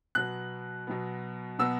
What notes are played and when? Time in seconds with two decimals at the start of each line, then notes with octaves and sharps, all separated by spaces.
0.15 B2 F#3 B3 F#6
0.87 B2 F#3 B3
1.59 B2 F#3 B3 E6